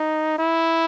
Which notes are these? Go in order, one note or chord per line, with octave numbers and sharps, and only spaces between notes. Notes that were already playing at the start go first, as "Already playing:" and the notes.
Already playing: D#4
E4